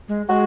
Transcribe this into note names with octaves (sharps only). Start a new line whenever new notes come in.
G#3
G#3 F#4